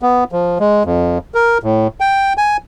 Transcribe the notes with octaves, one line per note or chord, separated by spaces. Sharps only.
B3
F3
G#3
F2
A#4
A2
G5
G#5